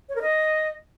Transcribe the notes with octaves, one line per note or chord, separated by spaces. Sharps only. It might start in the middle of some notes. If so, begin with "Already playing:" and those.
C#5
A#4
D#5